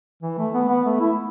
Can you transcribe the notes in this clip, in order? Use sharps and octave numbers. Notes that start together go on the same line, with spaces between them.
E3
A3
B3
B3
A3
E4